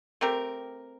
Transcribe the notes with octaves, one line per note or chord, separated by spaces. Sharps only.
A3 C4 G4 A#4